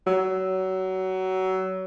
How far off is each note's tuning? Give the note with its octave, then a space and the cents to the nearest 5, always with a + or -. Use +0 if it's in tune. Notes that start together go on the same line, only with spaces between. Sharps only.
F#3 +25